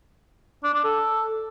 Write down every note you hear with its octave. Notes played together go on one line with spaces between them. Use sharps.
D4
D4
A4